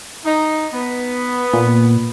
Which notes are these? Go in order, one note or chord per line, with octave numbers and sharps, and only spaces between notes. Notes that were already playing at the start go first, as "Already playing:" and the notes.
D#4
B3
A#2